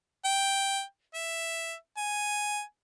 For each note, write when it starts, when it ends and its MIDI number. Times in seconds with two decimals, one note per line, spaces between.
0.25 0.82 79
1.14 1.74 76
1.97 2.62 80